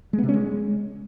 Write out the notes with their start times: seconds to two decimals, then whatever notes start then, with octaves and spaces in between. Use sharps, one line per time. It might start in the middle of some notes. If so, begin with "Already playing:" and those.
0.13 G#3
0.18 B3
0.23 C3
0.28 C#4
0.34 G#3